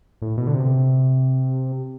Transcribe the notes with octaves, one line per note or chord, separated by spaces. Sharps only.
A2
B2
D3
C3